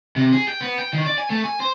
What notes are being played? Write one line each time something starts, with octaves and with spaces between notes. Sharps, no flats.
C3
G#4
G5
B3
G5
D#3
D5
G#5
A3
G#5
C5